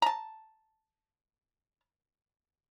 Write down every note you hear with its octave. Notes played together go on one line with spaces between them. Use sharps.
A5 A#5